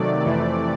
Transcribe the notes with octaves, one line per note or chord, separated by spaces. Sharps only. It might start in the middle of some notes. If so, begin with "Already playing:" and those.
Already playing: C3 D#3 F#3 A3 D5
F2 C3 E3 A3